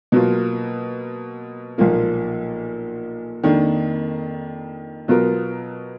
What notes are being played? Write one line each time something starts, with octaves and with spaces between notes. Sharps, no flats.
B2 F#3 A#3 F4
B1 A#2 F3 A#3 F4
F2 D#3 A#3 D4
B2 F#3 B3 F4 A#4